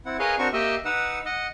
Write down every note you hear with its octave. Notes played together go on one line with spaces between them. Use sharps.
C4 E4 F#5
G#4 A#4 B4 C#5 D#5 F5
C4 D4 F#4 A#4 C#6
A#3 G4 D#5 E5
D#4 B4 F#5 E6
D#5 F#5